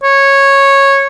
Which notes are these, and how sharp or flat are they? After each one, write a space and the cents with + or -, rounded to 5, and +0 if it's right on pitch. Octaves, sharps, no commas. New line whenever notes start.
C#5 -10